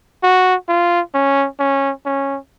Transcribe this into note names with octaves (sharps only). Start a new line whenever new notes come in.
F#4
F4
C#4
C#4
C#4